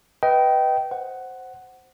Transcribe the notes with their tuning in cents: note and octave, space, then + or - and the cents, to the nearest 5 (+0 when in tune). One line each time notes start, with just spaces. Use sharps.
B4 +0 D#5 +15 G5 -20
C5 +0 F#5 +10